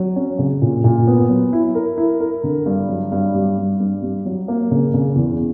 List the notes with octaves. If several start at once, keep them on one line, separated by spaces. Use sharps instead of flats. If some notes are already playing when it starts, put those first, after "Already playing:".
Already playing: F#3
C#4
C#3
A#2
A#2
B3
F#3
E4
A#4
E4
A#4
D3
G2
F#3
G2
G3
G2
G2
G3
F#3
A#3
C#3
C#3
E2